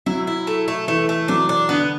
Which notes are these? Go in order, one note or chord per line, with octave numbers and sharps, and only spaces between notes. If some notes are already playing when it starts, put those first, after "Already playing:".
F#3 E4
E4
A3
A3
E3 A3
A3
F#3 D4
D4
D3 B3